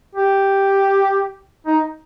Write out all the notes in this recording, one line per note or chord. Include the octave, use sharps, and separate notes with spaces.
G4
D#4